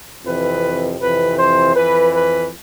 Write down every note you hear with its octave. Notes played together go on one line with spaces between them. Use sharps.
F2 C3 E3 B4
F2 C3 E3 B4
C5
F2 E3 B4
B4